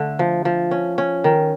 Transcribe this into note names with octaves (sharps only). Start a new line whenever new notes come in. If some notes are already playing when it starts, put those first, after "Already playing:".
Already playing: D3 A3
F3
F3
C#4
C#4
D#3